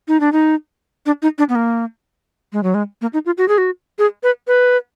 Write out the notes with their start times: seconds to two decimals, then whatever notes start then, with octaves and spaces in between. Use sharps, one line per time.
0.08 D#4
0.20 D4
0.32 D#4
1.06 D4
1.22 D#4
1.38 D4
1.49 B3
1.55 A#3
2.53 G#3
2.63 F#3
2.74 G#3
3.02 A#3
3.13 D#4
3.26 F4
3.38 F#4
3.48 G#4
3.58 F#4
3.99 G#4
4.23 B4
4.48 B4